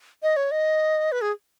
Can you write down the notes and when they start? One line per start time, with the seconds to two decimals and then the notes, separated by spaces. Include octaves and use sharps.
0.23 D#5
0.36 C#5
0.51 D#5
1.12 B4
1.21 G#4